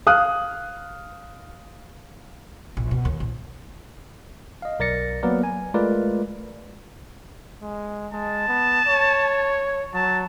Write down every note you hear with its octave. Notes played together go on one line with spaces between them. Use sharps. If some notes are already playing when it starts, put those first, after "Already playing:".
F5 D#6 F6 F#6
A#1
B2
D#2
A#1
D#5 F5
B1 A#4 D5 A6 A#6 C#7
F#3 A#3 B3 A#4 B4 D5
G#5
G#3 A3 F4 A#4 B4 D5
G#3
G#3 A5
B3
C#5
F#3 A5